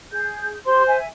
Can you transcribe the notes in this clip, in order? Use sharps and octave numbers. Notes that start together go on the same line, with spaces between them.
G#4 G6
G4 C5 C6
E5 G#5